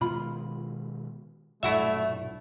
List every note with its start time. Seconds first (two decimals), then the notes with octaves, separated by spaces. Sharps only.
0.01 B2 D#3 G#3 F4 B5
1.63 B1 G2 A#2 A3 E4 F#4 D5 E5